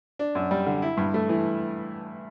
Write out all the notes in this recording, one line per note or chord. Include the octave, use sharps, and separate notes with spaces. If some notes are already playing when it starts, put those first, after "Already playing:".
D4
F#2
G3
D3
E4
G2
A3
E3